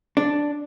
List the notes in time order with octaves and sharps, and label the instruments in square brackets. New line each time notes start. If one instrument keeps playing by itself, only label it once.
[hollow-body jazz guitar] D4